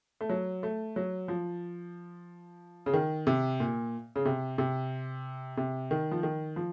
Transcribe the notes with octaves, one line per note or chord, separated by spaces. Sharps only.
A3
F#3
A3
F#3
F3
C#3
D#3
C3
A#2
C#3
C3
C3
C3
D#3
F3
D#3
F3